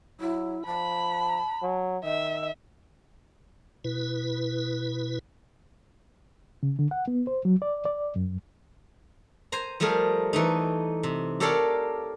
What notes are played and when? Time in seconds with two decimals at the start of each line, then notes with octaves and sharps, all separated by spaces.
0.20 F#3 E4
0.66 F3 A5 B5
1.62 F#3
2.04 D#3 D#5 E5
3.84 B2 E4 B4
6.63 C#3
6.79 D3
6.91 F#5
7.08 B3
7.27 C5
7.45 F#3
7.62 D5
7.85 D5
8.16 F#2
9.52 C5 G#5 A#5
9.80 F3 G3 A3 G#4 A#4
10.33 E3 A3 D#4
11.03 C3
11.40 G4 A4 A#4 C#5 D5 F5